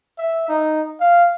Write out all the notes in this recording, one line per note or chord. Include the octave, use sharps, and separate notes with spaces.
E5
D#4
F5